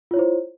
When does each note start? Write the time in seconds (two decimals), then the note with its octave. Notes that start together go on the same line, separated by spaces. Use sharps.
0.11 F4
0.14 C#5
0.16 E4
0.19 C5